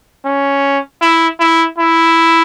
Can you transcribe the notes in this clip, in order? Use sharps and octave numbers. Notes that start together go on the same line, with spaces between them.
C#4
E4
E4
E4